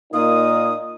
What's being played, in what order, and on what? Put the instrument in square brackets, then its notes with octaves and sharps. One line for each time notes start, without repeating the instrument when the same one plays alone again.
[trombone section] A#2 A#3 D#4 [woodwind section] F4 D#6